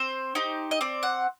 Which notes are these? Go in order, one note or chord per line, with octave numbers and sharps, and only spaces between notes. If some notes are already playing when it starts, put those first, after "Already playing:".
Already playing: C4 C5
D#4 G4
D#5
C4 D5
F#5